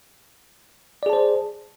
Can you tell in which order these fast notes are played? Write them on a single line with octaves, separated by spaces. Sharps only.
D5 G#4 A5 C5